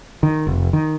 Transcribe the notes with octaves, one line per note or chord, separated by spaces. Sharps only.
D#3
F1
D#3